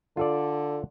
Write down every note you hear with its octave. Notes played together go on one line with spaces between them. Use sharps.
D3 F4 A4 D5